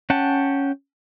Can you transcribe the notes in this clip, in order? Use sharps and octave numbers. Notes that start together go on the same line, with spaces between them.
C#4 F#5 G5 A5